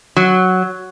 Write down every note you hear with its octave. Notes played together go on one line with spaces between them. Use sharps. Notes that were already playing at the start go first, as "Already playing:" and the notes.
F#3